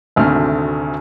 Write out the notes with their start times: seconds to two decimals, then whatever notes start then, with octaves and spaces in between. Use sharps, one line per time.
0.16 G#1 D2 C3 A3 F6